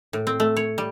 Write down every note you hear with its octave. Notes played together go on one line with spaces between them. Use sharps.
A2
C4
A3
C#5
G3